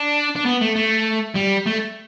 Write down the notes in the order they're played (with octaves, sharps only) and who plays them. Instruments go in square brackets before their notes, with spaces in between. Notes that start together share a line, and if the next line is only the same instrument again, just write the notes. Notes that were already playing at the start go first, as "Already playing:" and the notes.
Already playing: [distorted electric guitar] D4
D4
B3
A3
A3
G3
A3